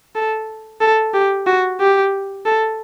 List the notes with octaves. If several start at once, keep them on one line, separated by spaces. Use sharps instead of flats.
A4
A4
G4
F#4
G4
A4